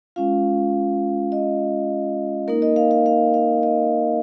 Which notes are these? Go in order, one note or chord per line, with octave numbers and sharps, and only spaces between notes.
G#3 C#4 F4 F5
D#5
A#3 D#4 A#4
D#5
F5
F5
F5
F5
D#5